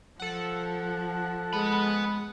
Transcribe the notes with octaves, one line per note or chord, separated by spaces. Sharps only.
F3 A4 F#5
G#3 B3 B5